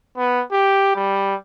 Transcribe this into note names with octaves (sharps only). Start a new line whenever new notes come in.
B3
G4
G3